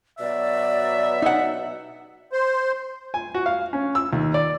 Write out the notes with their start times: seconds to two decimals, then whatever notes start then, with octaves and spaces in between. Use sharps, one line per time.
0.19 B2 F#3 D5 E5
1.22 D#4 F#5
2.32 C5
3.14 G#5
3.35 F#4
3.46 F5
3.73 C#4
3.95 E6
4.13 D#2
4.34 D5